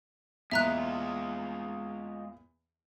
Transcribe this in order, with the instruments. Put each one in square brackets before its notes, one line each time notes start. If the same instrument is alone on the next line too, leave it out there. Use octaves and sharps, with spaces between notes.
[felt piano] E2 A#2 [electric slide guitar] G#3 F4 [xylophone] E5 A#5 F#6